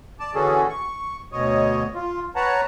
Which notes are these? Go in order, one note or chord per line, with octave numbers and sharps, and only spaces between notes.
D5 A5
D3 E3 C#4 F#4 G#4 A4
C#6
D2 B2 C#5 D#5
F4
B4 C#5 F#5 A5 A#5